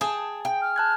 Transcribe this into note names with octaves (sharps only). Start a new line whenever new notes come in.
G#4 G5 A5
G5
F6
A5 F#6 G#6